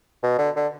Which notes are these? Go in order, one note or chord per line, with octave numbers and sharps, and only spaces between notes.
B2
D3
D3